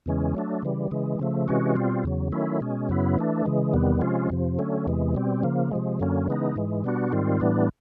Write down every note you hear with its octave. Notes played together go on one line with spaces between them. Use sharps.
E2 C#3 E3 G#3 C#4
F#3 A3 D4
C#3 E3 G3
C#3 E3 G#3
C#3 F3 A3
C3 E3 G#3 C#4 F#4
B2 G3 C4 F4
E2 C#3 F#3
D#3 F#3 A3 C#4 E4
B2 G#3 C#4
F#2 C#3 F#3 B3 E4
E3 A3 D4
C#3 E3 G#3
E2 C3 D#3 G3 B3
C3 F3 G#3 C#4 F4
F2 C3 F3
D3 F#3 A3 C#4
E2 C3 E3 G#3
B2 G3 C4
C#3 F3 A#3
C3 F3 G#3
F#2 D3 F#3 A#3 C#4
C#3 E3 G#3 B3 D#4
G#2 E3 G#3
B2 G3 B3 D4 F#4
G#2 D#3 G3 C4 F4
A2 E3 G3 B3 D4